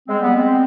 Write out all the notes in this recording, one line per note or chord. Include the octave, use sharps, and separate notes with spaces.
G#3 C4
G3 B3
G#3 C4